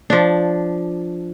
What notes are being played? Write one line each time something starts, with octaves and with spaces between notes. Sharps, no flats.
F3 D4